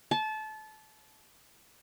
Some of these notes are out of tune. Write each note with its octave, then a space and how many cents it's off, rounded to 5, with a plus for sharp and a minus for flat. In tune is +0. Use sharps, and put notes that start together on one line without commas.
A5 -25